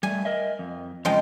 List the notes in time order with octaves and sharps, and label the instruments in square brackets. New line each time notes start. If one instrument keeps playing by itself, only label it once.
[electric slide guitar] G3 A3 [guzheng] G#5
[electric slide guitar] A#4 D#5 E5
F2
[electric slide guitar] F2 C#3 [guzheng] F3 G#3 G5